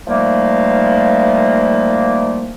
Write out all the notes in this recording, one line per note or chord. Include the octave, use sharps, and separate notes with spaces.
D#3 F3 G3 A3 A#3